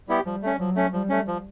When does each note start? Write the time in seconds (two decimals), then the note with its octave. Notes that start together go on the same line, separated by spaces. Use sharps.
0.08 G3 B3 E4 G4
0.26 F3 G3
0.43 A3 C#4
0.59 F3 F#3
0.76 A3 C#4
0.93 F3 G3
1.09 A3 C#4
1.28 F3